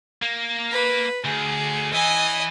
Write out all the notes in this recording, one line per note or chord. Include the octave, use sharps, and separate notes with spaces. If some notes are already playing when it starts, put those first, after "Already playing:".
A#3
B4
D2 G#4
E3 E4 D#5 G#5